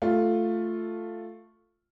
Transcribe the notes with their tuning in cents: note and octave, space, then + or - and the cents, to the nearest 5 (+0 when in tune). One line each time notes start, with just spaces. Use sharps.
A3 +0 F4 +0